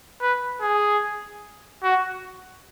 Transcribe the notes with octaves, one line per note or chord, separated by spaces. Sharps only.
B4
G#4
F#4